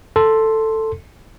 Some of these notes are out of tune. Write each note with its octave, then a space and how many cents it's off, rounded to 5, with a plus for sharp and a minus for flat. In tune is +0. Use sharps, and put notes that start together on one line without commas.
A4 +5 C6 +0